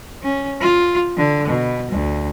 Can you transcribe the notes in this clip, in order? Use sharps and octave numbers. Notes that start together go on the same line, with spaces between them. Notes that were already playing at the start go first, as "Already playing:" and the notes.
C#4
F4
D3
B2
D2